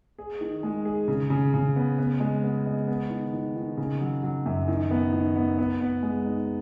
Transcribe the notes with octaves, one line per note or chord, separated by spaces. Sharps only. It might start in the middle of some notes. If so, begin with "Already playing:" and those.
G#4
D#3
G#3
G#4
C#3
C#3
C#3
B3
B3
G#3
B3
G#3
B3
D#3
D#3
D#3
C#3
F#3
F#3
F#2
D#3
B3
D#3
B3
B3
B3
G#3
D#4